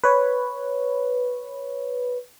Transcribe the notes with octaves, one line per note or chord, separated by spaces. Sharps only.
B4 C#5